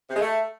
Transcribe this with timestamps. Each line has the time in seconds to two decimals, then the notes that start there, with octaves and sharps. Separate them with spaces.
0.09 C3
0.15 G#3
0.21 A3